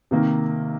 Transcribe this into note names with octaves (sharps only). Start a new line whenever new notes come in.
C3 D#3 A#3